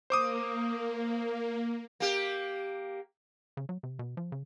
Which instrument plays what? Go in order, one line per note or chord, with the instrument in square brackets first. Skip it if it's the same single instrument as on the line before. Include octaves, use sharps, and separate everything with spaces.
[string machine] A#3 [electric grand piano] C5 D6 D#6
[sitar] A#3 G4
[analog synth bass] C#3
F#3
C3
B2
F3
C#3